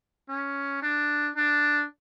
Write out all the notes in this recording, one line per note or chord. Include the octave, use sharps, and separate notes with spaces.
C#4
D4
D4